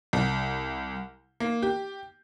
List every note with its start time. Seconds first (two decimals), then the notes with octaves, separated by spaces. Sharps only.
0.13 C2
1.40 A#3
1.62 G4